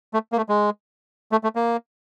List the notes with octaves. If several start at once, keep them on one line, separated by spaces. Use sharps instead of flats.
A3
A#3
A3
G#3
A3
A3
A#3